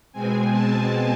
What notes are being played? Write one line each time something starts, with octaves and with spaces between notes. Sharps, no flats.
B2 G#3 C4 G#5
A5